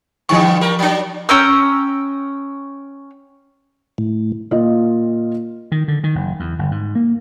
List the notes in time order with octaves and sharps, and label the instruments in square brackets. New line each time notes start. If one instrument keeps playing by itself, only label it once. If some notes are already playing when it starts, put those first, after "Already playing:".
[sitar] D3 G3 B3 [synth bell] F3 C#6
[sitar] G3 A#4
F#3 D4
[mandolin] C#4 G5 A#5 E6
[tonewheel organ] A2
[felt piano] A#2 F4 D#5
[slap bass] D#3
D3
D#3
F#1
E2
G1
G#2
A#3